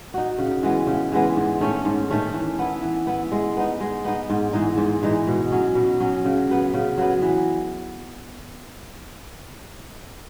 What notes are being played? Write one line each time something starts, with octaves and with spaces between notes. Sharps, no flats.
D#4 F#4
C#3
E3 G#3 B3
C#3
E3 G#3 B3
G#2
D#3 A3 C#4
G#2
D#3 A3 C#4
E3
B3 E4
E3
B3 E4
G#3
B3 D#4
G#3
B3 D#4
G#2
E3 G#3 D#4
G#2
E3 G#3 D#4
B2
F#3 C#4
B2
F#3 C#4
C#3
F#3 B3
C#3
F#3 B3
E3